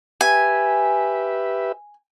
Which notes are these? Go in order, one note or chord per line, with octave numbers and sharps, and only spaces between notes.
G4 B4 E5 G#5